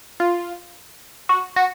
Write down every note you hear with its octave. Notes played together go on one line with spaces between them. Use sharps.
F4
F#4
F#4